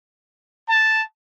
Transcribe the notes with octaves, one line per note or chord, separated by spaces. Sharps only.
A5